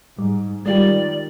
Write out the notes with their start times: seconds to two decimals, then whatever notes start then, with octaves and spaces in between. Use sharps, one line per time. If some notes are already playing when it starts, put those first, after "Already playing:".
0.19 G#2 G3
0.66 D#3 G3 G#3 F4 G4 D5